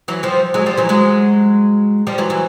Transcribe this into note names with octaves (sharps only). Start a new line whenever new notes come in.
E3 F#3
F3 G3
F#3 G#3
F3 G3
E3 F#3
F#3 G#3
F3 G3
E3 F#3
E3 F#3